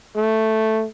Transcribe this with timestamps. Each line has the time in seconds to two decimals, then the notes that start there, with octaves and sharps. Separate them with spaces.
0.16 A3